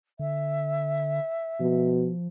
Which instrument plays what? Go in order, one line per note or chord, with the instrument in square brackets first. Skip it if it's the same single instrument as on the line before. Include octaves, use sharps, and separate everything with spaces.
[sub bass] D3 [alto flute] E5
[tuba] B2 [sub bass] F3